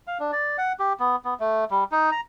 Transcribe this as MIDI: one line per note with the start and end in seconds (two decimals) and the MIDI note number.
0.07 0.18 77
0.20 0.31 62
0.32 0.57 74
0.58 0.73 78
0.79 0.93 67
1.00 1.16 59
1.25 1.34 59
1.40 1.64 57
1.71 1.84 55
1.92 2.10 63
2.12 2.21 82